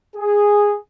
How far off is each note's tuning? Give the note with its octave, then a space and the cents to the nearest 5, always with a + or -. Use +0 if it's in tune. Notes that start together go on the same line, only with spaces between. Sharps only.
G#4 -10